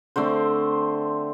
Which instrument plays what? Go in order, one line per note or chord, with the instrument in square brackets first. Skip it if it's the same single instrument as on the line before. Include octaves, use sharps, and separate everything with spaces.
[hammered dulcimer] D3 A3 C4 C5